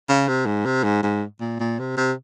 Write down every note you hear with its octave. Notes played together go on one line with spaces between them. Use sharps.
C#3
C3
G#2
C3
G#2
G#2
A#2
A#2
C3
C3